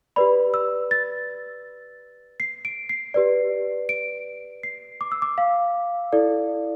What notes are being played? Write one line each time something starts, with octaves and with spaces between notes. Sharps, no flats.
G4 B4 D5 B5
E6
A6
C7
D7
C7
G4 B4 D5
D7
C7
D6
E6
D6
F5
E4 A4 D5